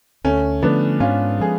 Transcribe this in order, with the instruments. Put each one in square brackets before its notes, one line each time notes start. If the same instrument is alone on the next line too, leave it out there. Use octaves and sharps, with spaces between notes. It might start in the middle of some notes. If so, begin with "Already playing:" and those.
[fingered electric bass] D2 [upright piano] A3 C#4
[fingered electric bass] D3 F3 A3 [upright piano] B3 D4
[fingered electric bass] G#2 [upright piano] C#4 F4
[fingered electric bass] F3 G#3 [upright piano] G#4